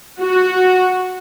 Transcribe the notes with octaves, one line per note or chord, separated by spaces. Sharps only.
F#4